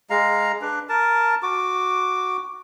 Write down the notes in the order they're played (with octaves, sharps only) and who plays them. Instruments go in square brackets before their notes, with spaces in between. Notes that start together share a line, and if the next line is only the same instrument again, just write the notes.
[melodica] G#3 F5 A#5
D4 B4
A#4 A5
F#4 D6